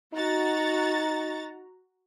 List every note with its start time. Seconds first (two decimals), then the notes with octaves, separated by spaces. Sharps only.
0.14 D#4 F#4 A#5 A6